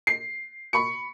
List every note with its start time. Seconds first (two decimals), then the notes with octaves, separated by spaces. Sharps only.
0.07 C7
0.73 B5 C#6 C#7